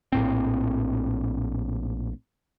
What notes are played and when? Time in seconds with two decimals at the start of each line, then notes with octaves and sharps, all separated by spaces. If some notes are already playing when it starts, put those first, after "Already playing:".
0.12 A#1 A2 C4